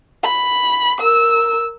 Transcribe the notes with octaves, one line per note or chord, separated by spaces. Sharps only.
B5
A#4 E6